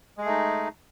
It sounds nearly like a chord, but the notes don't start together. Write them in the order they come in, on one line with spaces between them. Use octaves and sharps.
G#3 G#4 A3 D#4